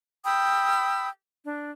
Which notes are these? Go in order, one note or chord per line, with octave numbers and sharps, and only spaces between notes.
G5 B5 D#6 E6
D4